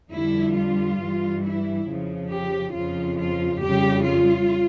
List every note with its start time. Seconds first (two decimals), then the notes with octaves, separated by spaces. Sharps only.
0.13 F2 D3 G3 E4
0.56 F4
1.00 G2 E3 G3
1.43 E4
1.87 F2 C#3 F3
2.31 G4
2.75 F2 C#3 F3 F4
3.18 F4
3.62 F2 C#3 G3 G4
4.06 F4